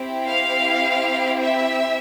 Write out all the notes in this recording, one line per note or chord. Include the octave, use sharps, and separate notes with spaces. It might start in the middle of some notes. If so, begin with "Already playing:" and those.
Already playing: C4 E4 G4
F5
E5